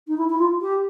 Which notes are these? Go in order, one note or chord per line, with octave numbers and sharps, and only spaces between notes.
D#4
E4
E4
F4
G4